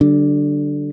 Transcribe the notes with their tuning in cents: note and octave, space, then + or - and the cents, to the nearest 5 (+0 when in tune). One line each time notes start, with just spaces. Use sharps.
D3 +0 G3 -40 D4 +0